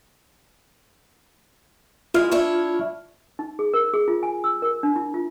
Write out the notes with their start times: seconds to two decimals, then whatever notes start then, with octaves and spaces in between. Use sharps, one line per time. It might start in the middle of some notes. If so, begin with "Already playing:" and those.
2.14 G#3 E4 F4 F6
2.31 D4 E4 C#5
3.39 D#4
3.59 G#4
3.74 A#4
3.94 G#4
4.08 F4
4.23 G#5
4.44 E6
4.62 A#4
4.83 D4
4.96 E4
5.14 F4